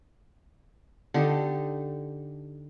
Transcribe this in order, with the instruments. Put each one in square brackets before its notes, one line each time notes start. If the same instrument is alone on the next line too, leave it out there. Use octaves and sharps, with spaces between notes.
[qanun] D3 D#4 G4 A4